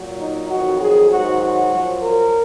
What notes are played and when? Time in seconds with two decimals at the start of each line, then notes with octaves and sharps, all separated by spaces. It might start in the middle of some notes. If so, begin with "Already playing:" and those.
Already playing: A#2 F#3
0.20 D#4
0.50 F2 D#3 F#3 F#4
0.81 G#4
1.11 G#2 D#3 F#3 F#4
1.42 F#4
1.72 F#2 F3
2.02 A#4